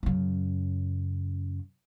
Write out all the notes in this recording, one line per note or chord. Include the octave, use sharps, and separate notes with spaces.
F#2 C#3